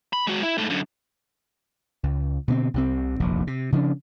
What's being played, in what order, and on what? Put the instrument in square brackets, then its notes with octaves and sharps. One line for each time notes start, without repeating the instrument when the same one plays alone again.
[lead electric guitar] B5
G#3 F#4
E4
G#2 A3
F#2 D3
[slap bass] C#2
B2 D3 A#3 C4
C2 C3 C4
F1 A#1 D#2
C3
C#3 F3 C#4 D4